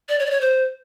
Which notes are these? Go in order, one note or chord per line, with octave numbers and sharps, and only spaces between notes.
D5
C#5
D5
C#5
C5